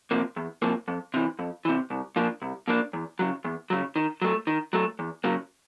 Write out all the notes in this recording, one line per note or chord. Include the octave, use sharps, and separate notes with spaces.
C3 F3 A#3
E2
C3 F3 A#3
F2
C3 E3
F2
C3 E3
C2
A#2 F3 A#3 D4
C2
A#2 F3 A#3 D4
E2
C#3 F#3
E2
C#3 F#3
D#3
F#3 A3
D#3
F#3 A3
E2
C#3 F#3 A#3